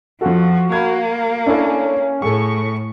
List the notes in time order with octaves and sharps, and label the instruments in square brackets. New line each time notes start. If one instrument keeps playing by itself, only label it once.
[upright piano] F2 F4 A4 [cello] F3 [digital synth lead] F#4
[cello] A#3 [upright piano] B5 G#6
[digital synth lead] C#4 [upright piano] D4 E4 A4
[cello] A2 [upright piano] G#4 A4 [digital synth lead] C#6